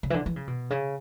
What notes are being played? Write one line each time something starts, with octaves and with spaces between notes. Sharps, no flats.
C#3
E3
D3
E3
C#3
B2
C#3